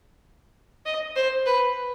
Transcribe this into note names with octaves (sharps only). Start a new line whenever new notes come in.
D#5
C5
B4